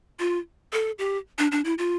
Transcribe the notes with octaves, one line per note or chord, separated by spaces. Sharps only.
F4
A4
G4
D4
D4
E4
F4